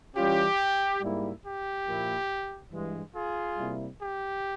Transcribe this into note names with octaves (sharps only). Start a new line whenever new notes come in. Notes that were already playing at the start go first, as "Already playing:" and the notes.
E3 G3 C#4 F4 G4
G#2 G3 A#3 E4
G4
A#2 F3 A#3 E4
G2 E3 G#3
F4 G#4
C3 G3 A#3 E4
G4